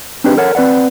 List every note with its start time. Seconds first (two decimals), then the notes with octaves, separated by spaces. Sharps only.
0.24 C4 D4 D#4 G4 G#4 B4
0.37 A4 A#4 C#5 F#5
0.55 C4 B4 D5 F#5